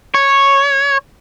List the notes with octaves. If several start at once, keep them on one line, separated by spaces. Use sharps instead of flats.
C#5